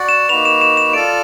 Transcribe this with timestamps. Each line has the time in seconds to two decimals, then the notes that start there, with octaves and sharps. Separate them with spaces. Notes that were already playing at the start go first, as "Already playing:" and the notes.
Already playing: F#4 D5 F#5
0.09 E7
0.29 A#3 D#4 F#4 B4 F7
0.45 E7
0.61 E7
0.77 E7
0.93 F4 A4 D5 D7